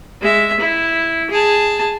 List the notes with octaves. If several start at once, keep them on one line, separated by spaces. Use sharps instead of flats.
G#3 E5
E4
G#4 A5